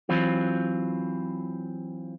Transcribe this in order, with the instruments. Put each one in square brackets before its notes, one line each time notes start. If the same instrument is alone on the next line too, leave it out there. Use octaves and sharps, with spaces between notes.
[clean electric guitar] E3 F#3 C4 F4